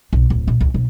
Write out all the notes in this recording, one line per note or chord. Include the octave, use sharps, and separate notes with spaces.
B1
D1
A#1
C#2
B1